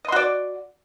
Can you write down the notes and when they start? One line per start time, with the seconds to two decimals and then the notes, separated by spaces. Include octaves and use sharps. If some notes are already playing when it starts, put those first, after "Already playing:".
0.05 D#5
0.08 C6
0.12 F#4
0.16 D5